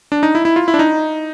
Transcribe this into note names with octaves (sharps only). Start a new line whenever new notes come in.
D4
D#4
E4
E4
F4
E4
D4
D#4